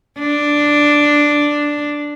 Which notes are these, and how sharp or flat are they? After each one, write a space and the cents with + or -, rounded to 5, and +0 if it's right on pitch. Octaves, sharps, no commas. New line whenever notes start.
D4 +0